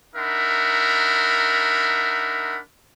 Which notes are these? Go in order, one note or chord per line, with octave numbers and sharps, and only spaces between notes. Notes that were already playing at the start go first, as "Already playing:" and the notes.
D4 D#4 A#4 E5 F#5 B5